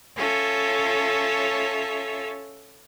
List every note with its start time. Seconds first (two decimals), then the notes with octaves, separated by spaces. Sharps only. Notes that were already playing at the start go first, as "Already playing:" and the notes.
0.16 C#4 F4 A4 C#5 E5